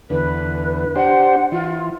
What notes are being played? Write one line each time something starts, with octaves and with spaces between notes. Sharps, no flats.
E2 D3 B4
D4 G4 C5 F#5
E3 F4